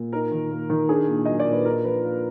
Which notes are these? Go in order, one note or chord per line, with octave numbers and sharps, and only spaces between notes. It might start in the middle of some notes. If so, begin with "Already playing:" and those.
Already playing: A#2
D#4 A#4
D#3
A#3
D#3
D4 G#4
A#2
F#3 D#5
D5
A#2
B4
D4 A#4
F3 B4
A#3